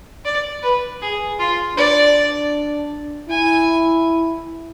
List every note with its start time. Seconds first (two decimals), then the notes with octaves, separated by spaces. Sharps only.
0.25 D5
0.63 B4
1.02 G#4
1.40 F4
1.77 D4 D5
3.29 E4 G#5